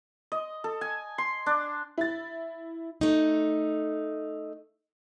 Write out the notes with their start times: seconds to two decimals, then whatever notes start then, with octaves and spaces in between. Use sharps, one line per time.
0.32 D#5
0.64 A4
0.81 G#5
1.18 C6
1.46 D4
1.98 E4 A6
3.01 A3 D#4